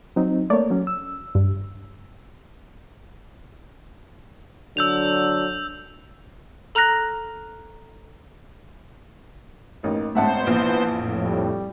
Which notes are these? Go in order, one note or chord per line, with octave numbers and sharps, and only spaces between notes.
F#3 C4 D#4
A3 A#3 C#5 D5
F#3 C#4
E6
G2
D3 F#3 D4 E6 G6 F7
A4 A#5 F6 F#6 A#6
A1 A#3 D#4
A1 G#2 B3 C5 E5 F#5 A5
A#1 E3
F2 A2
G3